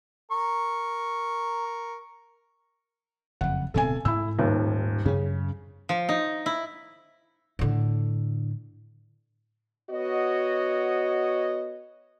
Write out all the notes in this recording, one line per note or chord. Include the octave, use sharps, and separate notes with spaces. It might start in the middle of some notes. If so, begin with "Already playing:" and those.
A#4 C#6
F#1 F2 F#5
D1 B2 C4 A4 G#5
G#2 E4 E6
D#1 D#2
F#2 C#3 C#4
F3
D#4
E4
A2 D3
B3 F#4 C#5 D#5